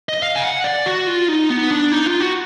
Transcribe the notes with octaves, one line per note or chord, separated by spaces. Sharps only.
D#5
F5
G#5
F#5
D5
F#4
F4
D#4
B3
D4
D#4
F4
F#4